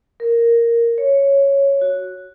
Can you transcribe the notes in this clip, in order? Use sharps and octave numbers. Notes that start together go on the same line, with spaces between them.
A#4
C#5
F#4